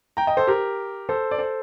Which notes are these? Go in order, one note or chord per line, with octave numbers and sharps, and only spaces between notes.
G5 A#5
D#5 G5
A4 C5
G4 A#4
A4 C5
D5
A4 C5